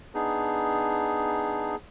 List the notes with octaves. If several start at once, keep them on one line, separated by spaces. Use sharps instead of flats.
B3 D4 D#4 G#4